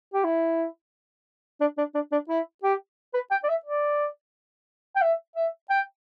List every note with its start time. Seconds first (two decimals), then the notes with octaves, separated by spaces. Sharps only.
0.14 G4
0.25 E4
1.61 D4
1.78 D4
1.95 D4
2.12 D4
2.29 E4
2.63 G4
3.14 B4
3.31 G5
3.44 D5
3.49 E5
3.66 D5
4.96 G5
5.02 E5
5.36 E5
5.70 G5